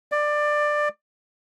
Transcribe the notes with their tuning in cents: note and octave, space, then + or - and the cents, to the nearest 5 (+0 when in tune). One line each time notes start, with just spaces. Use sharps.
D5 +15